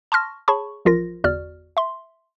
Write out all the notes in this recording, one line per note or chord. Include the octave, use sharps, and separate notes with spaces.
A5 C6 C#6 F6 A#6
G#4 C#5 A5 B5 C#6
A1 F3 F4 A#4 A#6
G1 E2 F#4 D5 F6
E5 C6